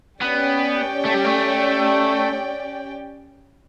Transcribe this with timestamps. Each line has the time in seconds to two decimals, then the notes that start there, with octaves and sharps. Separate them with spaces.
0.21 B3 C#4 G4 D5 G5
1.05 A3
1.14 G3
1.25 A3